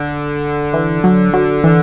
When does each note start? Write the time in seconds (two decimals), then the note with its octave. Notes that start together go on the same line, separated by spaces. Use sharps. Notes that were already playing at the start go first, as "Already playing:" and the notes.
Already playing: D3
0.73 E3
1.04 F#3
1.33 F#3
1.64 E3